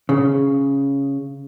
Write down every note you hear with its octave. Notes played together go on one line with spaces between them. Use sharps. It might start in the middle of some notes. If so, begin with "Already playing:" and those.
C#3